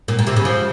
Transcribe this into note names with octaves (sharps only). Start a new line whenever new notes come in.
A#2
A#2
C3
C#3
F3